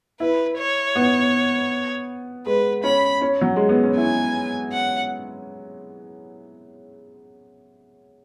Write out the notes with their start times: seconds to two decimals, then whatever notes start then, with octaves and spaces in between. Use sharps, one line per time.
0.20 E4 B4
0.58 C#5
0.95 B3
2.46 G#3 B4
2.84 C#4 B5
3.21 C#4
3.41 F#3
3.56 G#3
3.69 B3
3.83 C#4
3.97 E4 G#5
4.72 F#5